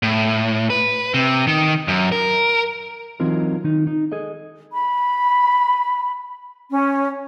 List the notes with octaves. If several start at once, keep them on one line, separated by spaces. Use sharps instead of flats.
A2
B4
C3
D#3
F#2
A#4
E3 F#3 C4 D#4 F4 A#4
D#3 D#4
D#4
G#4 A4 D#5
B5
C#4